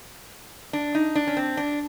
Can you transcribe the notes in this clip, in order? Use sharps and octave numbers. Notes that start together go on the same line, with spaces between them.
D4
D#4
D4
C#4
C4
D4